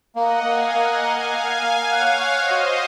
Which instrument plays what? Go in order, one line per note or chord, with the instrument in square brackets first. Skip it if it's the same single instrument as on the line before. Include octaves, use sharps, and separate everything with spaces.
[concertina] A#3 [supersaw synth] D#5 F#5
[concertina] A#3 [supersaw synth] F5 G#5
[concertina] A#3 [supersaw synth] D#5 F#5
[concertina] A#4 [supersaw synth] F5 G#5
[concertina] A#3
A#3
[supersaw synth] C#5 F5 [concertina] F#5
[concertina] F#5
[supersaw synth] C5 D#5
[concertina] F#4